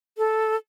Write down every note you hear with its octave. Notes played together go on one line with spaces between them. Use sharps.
A4